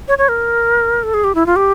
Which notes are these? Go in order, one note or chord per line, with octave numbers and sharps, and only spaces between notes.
C#5
C#5
A#4
A4
G#4
G4
E4
F4
G4